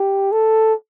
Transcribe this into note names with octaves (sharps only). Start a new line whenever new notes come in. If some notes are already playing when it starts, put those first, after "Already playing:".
Already playing: G4
A4